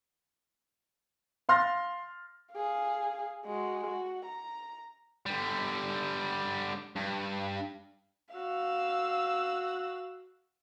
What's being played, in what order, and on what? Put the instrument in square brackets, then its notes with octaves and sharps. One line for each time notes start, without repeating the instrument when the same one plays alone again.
[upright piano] F5 C6 F6 A6 A#6
[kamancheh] G#4 F5
G#3 F#4
F#4
A#5
[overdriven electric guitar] D3 G3
G2
[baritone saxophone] F#4 [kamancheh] F5 E6